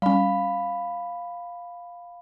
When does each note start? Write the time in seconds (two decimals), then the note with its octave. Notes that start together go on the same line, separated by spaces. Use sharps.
0.02 G3 C#4 F5 B5